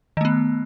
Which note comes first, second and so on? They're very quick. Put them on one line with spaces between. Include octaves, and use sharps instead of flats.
D#3 A3 B3